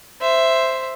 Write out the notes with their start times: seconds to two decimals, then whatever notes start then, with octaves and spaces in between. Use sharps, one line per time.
0.21 C5 E5